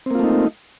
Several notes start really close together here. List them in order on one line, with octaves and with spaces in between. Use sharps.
C4 A#3 F4 A3 D#4